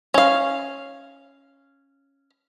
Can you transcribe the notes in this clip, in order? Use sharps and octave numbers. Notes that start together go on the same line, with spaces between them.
C#4 F5